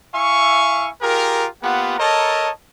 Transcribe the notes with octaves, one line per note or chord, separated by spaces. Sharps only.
E4 E5 F5 G#5 C#6
F4 G4 G#4 A#4
A#3 B3 F4 G4 F#5
A4 A#4 C#5 D#5 A5 A#5